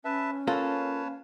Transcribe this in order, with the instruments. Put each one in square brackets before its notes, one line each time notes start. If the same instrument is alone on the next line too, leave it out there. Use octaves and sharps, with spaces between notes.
[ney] C#4 [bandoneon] B4 E5 A5
[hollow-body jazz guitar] A#3 F4 A4 [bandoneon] B4 C#5 A5 [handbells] F5